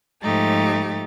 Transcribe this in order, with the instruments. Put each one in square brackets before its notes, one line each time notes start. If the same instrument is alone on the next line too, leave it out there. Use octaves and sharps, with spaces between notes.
[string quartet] G#2 F3 A3 D#4 G4 A6